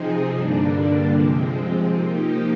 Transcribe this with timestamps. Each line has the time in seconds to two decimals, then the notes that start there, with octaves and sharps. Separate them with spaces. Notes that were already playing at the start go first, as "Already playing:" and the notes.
Already playing: C3 F3 C4 D#4 G#4
0.32 G2 D3 G3 A#3 D4
1.09 C3 F3 G#3 C4
1.87 F3 A#3 D#4 G4